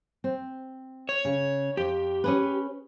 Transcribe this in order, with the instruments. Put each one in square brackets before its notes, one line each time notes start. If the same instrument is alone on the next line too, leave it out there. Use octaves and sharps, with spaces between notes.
[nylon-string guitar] C4
[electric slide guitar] C#5
[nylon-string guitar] C#3
[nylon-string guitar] F2 [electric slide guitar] G4
[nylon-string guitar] C#4 G#4 B4